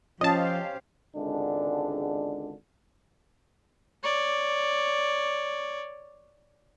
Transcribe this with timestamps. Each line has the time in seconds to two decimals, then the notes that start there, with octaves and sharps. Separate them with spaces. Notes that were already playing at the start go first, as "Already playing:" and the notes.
0.21 F3 C#4 G4 C5 D#5 F5 A5
1.15 G#1 C#2 D3 G#3 D4
4.03 C#5 D5